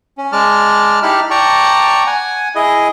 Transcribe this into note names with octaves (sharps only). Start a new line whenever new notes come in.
C#4
G#3 D5 A5 F6
D#4 E4 G4 A5 B5 F6
D5 G5 A5 A#5 C#6
F#5 G#5
E4 G#4 D#5